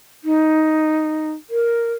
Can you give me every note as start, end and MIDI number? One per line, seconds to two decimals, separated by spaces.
0.24 1.31 63
1.50 1.93 70